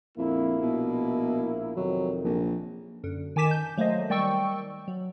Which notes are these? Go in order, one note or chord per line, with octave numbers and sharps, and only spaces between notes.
A#1 F2 A#3 E4
B2
F2 C3 D#3 F#3
A#1
F#2 D3
D#3 G#5 A5 D6 B6 E7
G6
F#3 A3 A#3 C5 D#5
D#3 G3 D5 G5 C#6 E6
F#3